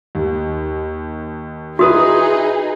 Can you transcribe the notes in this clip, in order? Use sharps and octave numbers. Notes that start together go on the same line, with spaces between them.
D#2
D#4 E4 F#4 G#4 B4 D#6